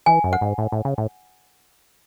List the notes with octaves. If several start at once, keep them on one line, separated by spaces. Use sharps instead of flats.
E3 G#5
F#2
F#5
G#2
A2
A2
C#3
A2